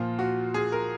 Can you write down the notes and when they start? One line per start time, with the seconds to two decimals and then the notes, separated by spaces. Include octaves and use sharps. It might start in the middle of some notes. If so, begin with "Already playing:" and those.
Already playing: A#2 F3 F4
0.19 F#4
0.54 G#4
0.72 A#4